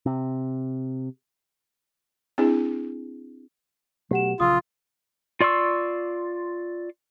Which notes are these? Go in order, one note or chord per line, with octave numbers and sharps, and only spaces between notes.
C3
C4 D4 E4 G#4
B2 F#3 A3 G4 F#5 E7
A#1 C#3 F#3 F4 D#6 E6
F4 D5 C6 C#6 E6